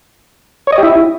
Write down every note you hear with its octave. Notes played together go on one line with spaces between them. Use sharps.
C#5
D#5
G4
E4